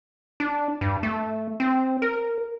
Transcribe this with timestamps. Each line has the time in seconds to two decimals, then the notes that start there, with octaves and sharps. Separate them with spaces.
0.40 D4
0.81 G2
1.03 A3
1.60 C4
2.02 A#4